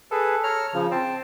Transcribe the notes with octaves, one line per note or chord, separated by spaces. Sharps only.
G#4 A4 B4
C#5 A#5 F6
C#3 F3
C4 A5